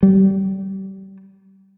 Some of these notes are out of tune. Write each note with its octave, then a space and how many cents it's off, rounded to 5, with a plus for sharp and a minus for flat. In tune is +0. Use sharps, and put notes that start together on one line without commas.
G3 -25